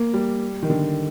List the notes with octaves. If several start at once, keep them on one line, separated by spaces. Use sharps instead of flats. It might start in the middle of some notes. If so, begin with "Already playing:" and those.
Already playing: A#3
G3
D#3
D3